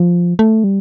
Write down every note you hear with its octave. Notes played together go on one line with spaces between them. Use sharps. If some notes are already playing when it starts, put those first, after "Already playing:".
Already playing: F3
A3
G3